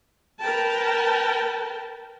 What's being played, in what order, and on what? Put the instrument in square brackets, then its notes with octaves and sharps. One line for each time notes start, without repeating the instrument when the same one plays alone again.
[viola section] A#4 B4 G5 A5